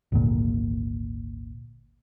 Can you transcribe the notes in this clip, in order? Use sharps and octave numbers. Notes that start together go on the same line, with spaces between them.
G#1 D2 A#2